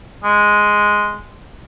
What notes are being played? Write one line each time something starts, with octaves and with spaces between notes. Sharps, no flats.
G#3